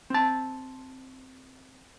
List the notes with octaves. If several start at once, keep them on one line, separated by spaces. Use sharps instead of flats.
C4 A5